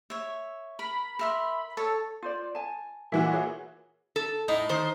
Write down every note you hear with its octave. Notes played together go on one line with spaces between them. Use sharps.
C#5 E5
A#4 B5
A#4 E5 C6
A4 C#5
F4 C5 D5
G#5 A5
A#2 E3 E4 F#4 E5 F5
G#4 C#5
A4
A2 D#4
D#3 C5